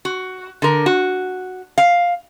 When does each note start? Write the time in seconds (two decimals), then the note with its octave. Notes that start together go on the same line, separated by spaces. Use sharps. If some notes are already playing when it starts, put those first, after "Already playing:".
0.05 F#4
0.62 D3 A#4
0.86 F#4
1.78 F5